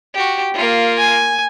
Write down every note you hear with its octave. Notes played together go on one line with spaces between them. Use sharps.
F#4 G4
A#3 F4
G#5